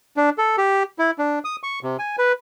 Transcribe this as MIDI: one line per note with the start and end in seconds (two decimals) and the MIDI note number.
0.17 0.30 62
0.38 0.56 69
0.58 0.83 67
0.99 1.11 64
1.19 1.39 62
1.45 1.56 87
1.63 1.79 85
1.83 1.97 48
1.99 2.16 80
2.18 2.32 71